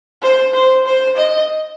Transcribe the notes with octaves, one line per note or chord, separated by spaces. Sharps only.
C5
C5
C5
D#5